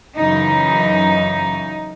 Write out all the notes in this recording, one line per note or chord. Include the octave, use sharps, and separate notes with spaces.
F#2 C#3 E3 D#4